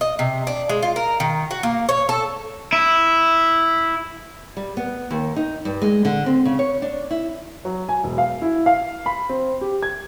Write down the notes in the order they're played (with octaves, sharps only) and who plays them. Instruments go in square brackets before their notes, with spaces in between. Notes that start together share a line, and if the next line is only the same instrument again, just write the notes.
[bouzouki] D#5
C3
D4
G#3
F4
A#4
D#3
F#4
A#3
C#5
A4
[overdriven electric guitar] E4
[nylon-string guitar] G3
B3
D#2
D#4
G2
G#3
D3
C4
C#3
C#5
D4
E4
[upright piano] F#3
G#5
E1
F5
E4
F5
B5
C4
G4
G#6